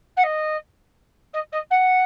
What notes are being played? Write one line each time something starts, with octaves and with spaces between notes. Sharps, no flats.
F#5
D#5
D#5
D#5
F#5